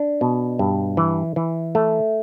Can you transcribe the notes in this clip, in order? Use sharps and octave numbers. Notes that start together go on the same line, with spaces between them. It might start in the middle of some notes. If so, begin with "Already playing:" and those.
Already playing: D4
B2
G2
E3
E3
A3